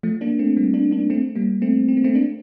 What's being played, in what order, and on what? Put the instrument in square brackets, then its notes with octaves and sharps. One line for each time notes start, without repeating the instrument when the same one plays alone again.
[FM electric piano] F3 A3
A#3 D4
A3 C4
G3 A#3
A#3 D4
A#3 D4
A3 C4
G3 A#3
A3 C4
C4
A#3
A3 C4
A#3 D4